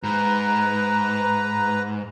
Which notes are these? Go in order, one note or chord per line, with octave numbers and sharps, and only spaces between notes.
G#2 B4 A#5